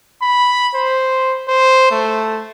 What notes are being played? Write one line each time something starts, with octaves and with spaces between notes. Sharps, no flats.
B5
C5
C5
A3